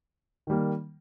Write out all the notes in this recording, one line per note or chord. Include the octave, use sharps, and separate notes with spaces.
D#3 G3 A#3